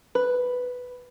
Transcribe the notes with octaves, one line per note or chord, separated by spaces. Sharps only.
B4